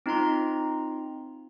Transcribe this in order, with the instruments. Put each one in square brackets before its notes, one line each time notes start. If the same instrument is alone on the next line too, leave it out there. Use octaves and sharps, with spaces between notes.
[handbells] C4 D#4 F4 A#5 C6